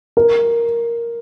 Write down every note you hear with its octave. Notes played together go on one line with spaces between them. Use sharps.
A#4